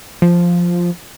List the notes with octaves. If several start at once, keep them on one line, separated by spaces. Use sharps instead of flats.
F3